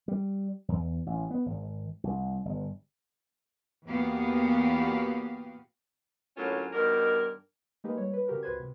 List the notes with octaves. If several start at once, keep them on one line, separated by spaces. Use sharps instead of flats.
G3
E2
A1
B3
G#1
C2
G1
E2 A#2 B3 F#4 G4 F5
A2 D3 F#3 A#3 C#4 F4
G2 B2 D#3 G4 A#4
G#3 A#3 D#4 G4 B4
G3 C#5
B4
C#3 F#4 G4 A#4
C#2 F#4 B4 C5 G#6
C3